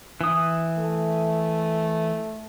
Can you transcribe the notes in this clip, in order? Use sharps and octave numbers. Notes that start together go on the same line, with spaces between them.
E3 D#6
A3